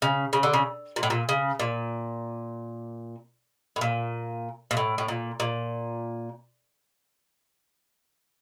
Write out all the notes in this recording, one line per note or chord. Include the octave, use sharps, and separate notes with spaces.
C#3
C#3
D3
C#3
A#2
A2
A#2
C#3
A#2
A2
A#2
A#2
A2
A2
A#2
A#2